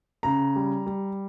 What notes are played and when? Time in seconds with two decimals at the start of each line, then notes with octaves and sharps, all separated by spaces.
0.23 C#3 A#5
0.56 G3
0.86 G3